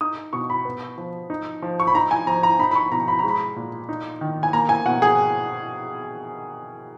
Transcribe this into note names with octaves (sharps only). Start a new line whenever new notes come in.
D#4 D#6
B2 C#6
B5
B3
F3
D#4
F3
C#6
B5
D#4 A#5
G#5
F3 A#5
A#5
D#4 B5
B5
C#6
B2 A#5
B5
G#3 A#5
B5
A#2
D#4
D#3
G#5
A#3 A#5
G#5
B2 F#5
G#4